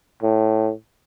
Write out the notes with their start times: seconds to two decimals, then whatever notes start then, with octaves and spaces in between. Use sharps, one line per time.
0.23 A2